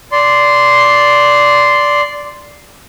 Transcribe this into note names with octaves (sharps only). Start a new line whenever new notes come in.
D5 C6